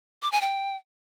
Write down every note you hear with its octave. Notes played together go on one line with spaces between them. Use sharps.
D6
G#5
G5